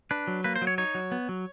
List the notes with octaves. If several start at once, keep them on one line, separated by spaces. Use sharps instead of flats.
D4 B4
F#3
A#3 B4
C5
F#3
C#5
D#4 C#5
F#3
B3
F#3